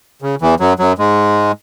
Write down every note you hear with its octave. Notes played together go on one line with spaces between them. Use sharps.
C#3
E2 E3
F#2 F#3
F#2 F#3
G#2 G#3